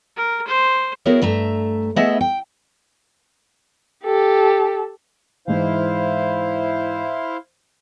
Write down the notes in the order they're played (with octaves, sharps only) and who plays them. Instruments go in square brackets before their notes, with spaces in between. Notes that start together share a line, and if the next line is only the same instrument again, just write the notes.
[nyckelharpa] A#4
C5
[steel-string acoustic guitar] B3 E4 F#4 G#4 A#4 C#5
G2 A3 E5 A#5
A3 B3 E4 G#4 D#5 E5
G5
[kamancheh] G4 A4
[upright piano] G#2 E3 [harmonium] E4 C5 F5